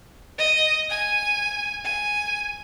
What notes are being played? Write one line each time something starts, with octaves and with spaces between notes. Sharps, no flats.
D#5
G#5
G#5